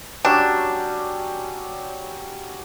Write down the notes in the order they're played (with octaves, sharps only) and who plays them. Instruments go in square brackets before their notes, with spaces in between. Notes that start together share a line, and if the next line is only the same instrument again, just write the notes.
[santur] F#3 G3 C#4 [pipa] D4